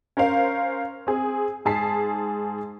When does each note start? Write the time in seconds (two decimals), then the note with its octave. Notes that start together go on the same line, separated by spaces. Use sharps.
0.17 C#4 A#4 C5 F5
1.07 C4 G#4
1.65 G#2 G#4 A5 B6 C7